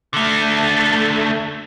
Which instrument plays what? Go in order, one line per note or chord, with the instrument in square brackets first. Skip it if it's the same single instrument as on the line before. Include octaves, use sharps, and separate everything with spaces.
[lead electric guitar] D3 A3